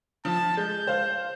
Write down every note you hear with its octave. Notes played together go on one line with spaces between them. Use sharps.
F3 A5
G#3 G6
C5 F5